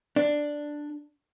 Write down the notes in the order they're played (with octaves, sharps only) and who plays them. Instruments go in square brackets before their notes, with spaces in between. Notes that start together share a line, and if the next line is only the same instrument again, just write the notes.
[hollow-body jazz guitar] D4